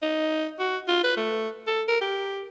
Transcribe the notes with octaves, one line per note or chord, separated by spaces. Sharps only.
D#4
F#4
F4
B4
A3
A4
A#4
G4